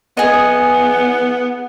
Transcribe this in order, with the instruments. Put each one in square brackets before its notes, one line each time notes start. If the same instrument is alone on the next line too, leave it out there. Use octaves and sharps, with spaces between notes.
[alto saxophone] B3 [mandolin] G#4 D#5